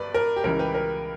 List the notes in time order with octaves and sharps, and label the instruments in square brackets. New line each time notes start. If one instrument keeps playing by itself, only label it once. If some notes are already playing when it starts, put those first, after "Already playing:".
Already playing: [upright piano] G1 G2 B4 D5
A#4
G4
C#2 C#3 E3 G3 A#4
G4 B4
A#4